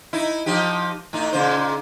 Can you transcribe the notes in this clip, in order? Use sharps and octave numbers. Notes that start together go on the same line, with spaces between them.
D#4 E4
F3 D#4 G4
A2 D#4
A#2 C#3 C5